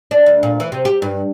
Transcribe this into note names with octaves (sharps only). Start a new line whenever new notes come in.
D4
D2
A#2
E3
C3
G4
G2